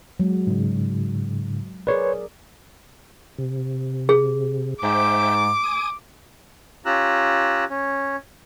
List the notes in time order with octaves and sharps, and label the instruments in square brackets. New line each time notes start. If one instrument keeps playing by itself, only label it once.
[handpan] F#3 G#3
[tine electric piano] G#2 C#3
[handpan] G#4 A#4 D5 [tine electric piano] B4 C#5
[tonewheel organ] C3
[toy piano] G#4
[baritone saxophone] G#2 [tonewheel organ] C5 E5 G5 [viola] D6
[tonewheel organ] G#5 D#6
[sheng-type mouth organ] C#4 F4 G4 A#5 E6 F#6
C#4